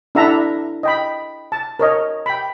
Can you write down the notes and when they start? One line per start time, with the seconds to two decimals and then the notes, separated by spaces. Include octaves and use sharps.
0.15 D4 E4 A4 E5 F#5 A#5
0.83 D#5 G5 B5
1.52 A5
1.79 A#4 C#5 D#5
2.26 G5 B5